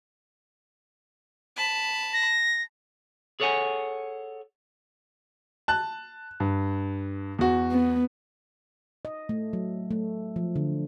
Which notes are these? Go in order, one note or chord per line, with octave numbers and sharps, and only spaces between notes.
A5 B5
A#6
G#4 A4 C#5 D5 F#5 G#5
A5 F#6
G2
E2 F#4
B3
D#5
A3
F#3
A3
F3
D3